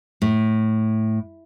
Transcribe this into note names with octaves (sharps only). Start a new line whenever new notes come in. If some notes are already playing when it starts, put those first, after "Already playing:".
A2